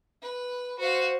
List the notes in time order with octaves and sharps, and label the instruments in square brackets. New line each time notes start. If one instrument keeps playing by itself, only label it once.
[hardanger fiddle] B4
[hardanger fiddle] F#4 F5 [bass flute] C5